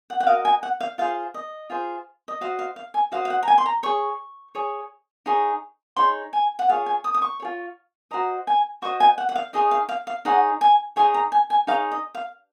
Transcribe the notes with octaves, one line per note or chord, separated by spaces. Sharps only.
F#5
F#5
F#4 A#4 D#5 F5
G#5
F#5
F5
F4 G#4 C5 F5
D#5
F4 G#4 C5
D#5
F#4 C5 D#5 F5
F5
F5
G#5
F#4 C5 D#5 F5
F5
F#5
A#5
G#5
C6
A#5
G#4 C#5 C#6
G#4 C#5
D#4 G#4 C#5
D#4 G#4 C#5 C6
G#5
F#5
F4 G#4 C#5 F5
G#5
D#6
D#6
C#6
F4 G#4 C#5
F#4 C5 D#5 A#5
G#5
F#4 C5 D#5 C#6
G#5
F#5
F#5
F5
D#4 G#4 C#5 D#5
F5
F5
F5
D#4 G#4 C#5 F#5
G#5
D#4 G#4 C#5 G#5
A#5
G#5
G#5
D#4 G#4 C#5 F5
D#5
F5